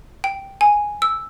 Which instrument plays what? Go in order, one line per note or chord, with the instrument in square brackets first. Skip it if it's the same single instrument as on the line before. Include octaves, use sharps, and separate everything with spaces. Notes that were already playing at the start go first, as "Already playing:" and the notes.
[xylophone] G5
G#5
E6